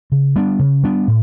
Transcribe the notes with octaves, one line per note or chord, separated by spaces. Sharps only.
C#3
G3 B3 D4
C#3
G3 B3 D4
A2